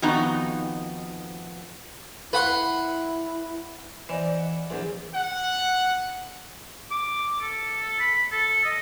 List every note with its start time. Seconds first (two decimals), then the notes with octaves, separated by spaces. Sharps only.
0.02 F2 D#3 B3 D#4 F#4 A#5
2.33 E4 B4 F#5 C6
4.09 E3 C5 D5 D#5
4.39 F#5
4.70 A#1 E2
5.14 F#5
6.91 D6
7.41 A4
8.00 B5
8.32 A4
8.65 D#5